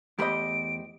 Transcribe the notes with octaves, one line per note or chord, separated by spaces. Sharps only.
E2 A3 G4 C5 D#5 B5 D7